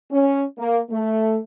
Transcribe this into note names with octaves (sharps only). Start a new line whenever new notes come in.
C#4
A#3
A3